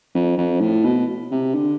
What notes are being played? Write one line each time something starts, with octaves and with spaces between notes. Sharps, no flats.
F2
F2
A2
B2
C3
D3